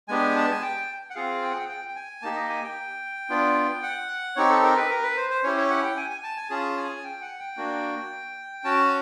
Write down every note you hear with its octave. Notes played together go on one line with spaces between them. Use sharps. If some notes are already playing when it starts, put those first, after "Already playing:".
G#3 B3 D4 G4 G#5
A5
G#5
G5
F#5
C4 F4 G#4 F5
G5
F#5
G5
G5
G5
G#5
A#3 D#4 G4 A5
D#5
G#5
G5
B3 D4 F4
F#5
C4 D#4 G4 C#5
A4
A#4
B4
A#4
B4
C5
C5
C#4 E4 G4 C#5
C#5
F#5
G5
G#5
G#5
A5
G#5
C#4 F4 G#4 A5
G#5
G5
F#5
G5
A#3 D4 F#4
C#4 F#4 A5